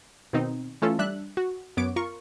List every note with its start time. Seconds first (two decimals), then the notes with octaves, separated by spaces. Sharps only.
0.33 B2 D#3 C4 D#4
0.82 E3 A3 C#4 F4 A4
0.99 G3 D4 E5 F#6
1.37 F#4
1.77 F#2 B3 C#5 D6 D7
1.96 F4 A#4 C#6